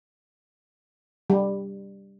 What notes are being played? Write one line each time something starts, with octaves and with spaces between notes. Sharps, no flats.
G3